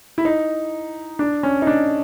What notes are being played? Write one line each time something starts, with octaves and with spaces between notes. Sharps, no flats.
E4
D#4
D4
C#4
D#4
D4